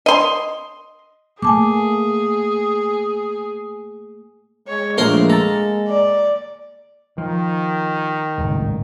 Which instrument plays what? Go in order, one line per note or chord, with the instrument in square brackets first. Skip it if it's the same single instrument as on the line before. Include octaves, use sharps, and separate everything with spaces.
[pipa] D#5 C6
[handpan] A3 A#3 [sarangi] G#4 [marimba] G#5 A5 D6
[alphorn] G#3 [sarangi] C#5
[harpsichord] A#1 A#4 C6 [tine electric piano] A3 [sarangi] A#3
[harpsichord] A4 [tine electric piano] A#5 A6
[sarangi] D5
[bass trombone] D#3 [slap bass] F3
[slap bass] D1 G#1 C#2